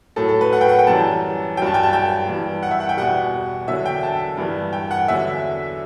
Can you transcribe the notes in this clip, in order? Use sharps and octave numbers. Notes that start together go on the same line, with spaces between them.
A2 F#3 A4
A4
B4
F#5
G5
F#5
G5
F#2 E3 G3 A5
F#3 G5
G2 A5
G5
A5
G5
G2 E3 G3
F#5
E5
F#5
G5
E2 B2 G3 F#5
E2 D3 F#3 E5
G5
A5
G2 E3 G3
G5
F#5
E2 D3 F#3 E5